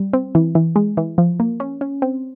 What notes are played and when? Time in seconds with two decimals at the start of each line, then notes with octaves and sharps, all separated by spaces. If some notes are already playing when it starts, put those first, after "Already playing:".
Already playing: G3
0.13 C4
0.35 E3
0.55 E3
0.76 G#3
0.97 E3
1.18 F3
1.40 A#3
1.60 C#4
1.81 C#4
2.02 C4